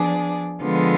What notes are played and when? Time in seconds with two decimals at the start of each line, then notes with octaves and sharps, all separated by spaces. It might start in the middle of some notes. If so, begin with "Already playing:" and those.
Already playing: F3 B3 D4 G#4 D5
0.63 D3 F3 G#3 B3 F4